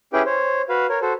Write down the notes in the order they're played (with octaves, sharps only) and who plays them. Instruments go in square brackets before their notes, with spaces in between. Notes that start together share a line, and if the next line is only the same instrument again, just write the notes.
[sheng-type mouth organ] C#4 E4 G4 G#4 B4 G5
C5 C#5
F#4 B4 F5
A#4 C#5
F#4 A4 C5